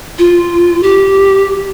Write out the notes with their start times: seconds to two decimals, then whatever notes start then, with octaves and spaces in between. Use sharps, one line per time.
0.19 F4
0.83 G4